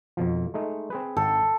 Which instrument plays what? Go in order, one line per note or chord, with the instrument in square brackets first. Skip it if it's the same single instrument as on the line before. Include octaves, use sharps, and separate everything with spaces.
[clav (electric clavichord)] F2 B2 F3
G#3 A3 D#4
C4 G#4 B4
[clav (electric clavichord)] G#1 G5 [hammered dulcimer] A4